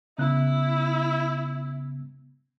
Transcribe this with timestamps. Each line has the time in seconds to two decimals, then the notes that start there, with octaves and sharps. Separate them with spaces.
0.18 C#3 B3 E4 F#6